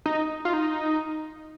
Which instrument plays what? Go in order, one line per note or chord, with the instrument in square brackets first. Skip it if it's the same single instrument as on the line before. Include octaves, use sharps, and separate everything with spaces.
[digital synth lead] D#4
F4
D#4